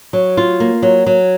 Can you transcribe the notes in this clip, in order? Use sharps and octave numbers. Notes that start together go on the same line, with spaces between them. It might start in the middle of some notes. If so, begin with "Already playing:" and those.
F#3
F4
A#3
F#3
F#3